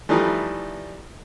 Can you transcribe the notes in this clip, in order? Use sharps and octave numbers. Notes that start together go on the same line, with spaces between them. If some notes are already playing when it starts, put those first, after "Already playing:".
E3 F3 G3 A3 D#4